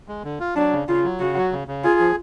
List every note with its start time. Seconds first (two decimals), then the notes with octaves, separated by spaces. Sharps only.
0.08 G#3
0.24 D3
0.40 F4
0.56 F#3 D4
0.73 C#3
0.88 C#3 F4
1.04 F#3
1.20 C#3 F#4
1.36 F#3
1.52 C#3
1.68 C#3
1.84 F4 G#4
1.99 F3